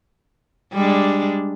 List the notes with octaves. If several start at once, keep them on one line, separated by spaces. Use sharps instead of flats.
G3 G#3 D4